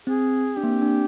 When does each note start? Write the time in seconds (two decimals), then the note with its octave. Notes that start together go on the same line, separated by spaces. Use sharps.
0.07 C4 G#4
0.57 D4 G4
0.63 A#3
0.69 C4
0.82 D4